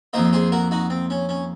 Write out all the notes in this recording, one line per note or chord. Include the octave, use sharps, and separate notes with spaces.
F2 D#3 A#3 C5 D#5
G#4 C5
F#4 A#4
D#4 F#4
C4
C#4
C#4